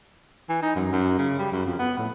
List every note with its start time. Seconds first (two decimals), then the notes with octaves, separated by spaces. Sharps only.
0.49 E3
0.62 D#4
0.75 F#2
0.92 F#2
1.19 C#3
1.39 G3
1.52 F#2
1.66 F2
1.79 B3
1.98 A2